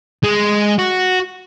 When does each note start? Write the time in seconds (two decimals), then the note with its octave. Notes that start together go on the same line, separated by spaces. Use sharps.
0.24 G#3
0.79 F#4